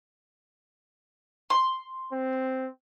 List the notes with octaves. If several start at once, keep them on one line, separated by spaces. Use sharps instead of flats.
C6
C4